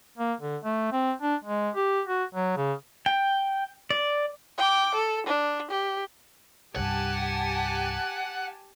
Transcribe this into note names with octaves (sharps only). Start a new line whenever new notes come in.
A#3
D3
A3
C4
D4
G#3
G4
F#4
F#3
C#3
G5
D5
G5 D6
A4
D4
G4
C2 G2 G4 F#5 G#5 A5